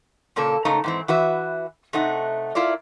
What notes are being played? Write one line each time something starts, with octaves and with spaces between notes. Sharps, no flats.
A#2 C#3 A#3 A4
G#2 C#3 A3 D#4 A#4 A#5
G#2 E3 C4
E3 F#4 B4 E5
C3 A3 D#4 F#5
E4 F4 A#4 D5